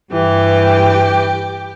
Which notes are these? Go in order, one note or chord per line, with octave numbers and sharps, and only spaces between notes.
G2 E3 G4